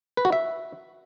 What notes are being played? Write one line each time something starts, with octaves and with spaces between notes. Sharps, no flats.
B4
F#4
E5